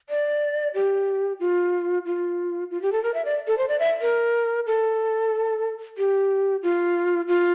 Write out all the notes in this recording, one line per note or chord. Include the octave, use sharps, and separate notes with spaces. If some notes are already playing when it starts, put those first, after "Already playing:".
D5
G4
F4
F4
F4
G4
A4
A#4
E5
D5
A4
C5
D5
E5
A#4
A4
G4
F4
F4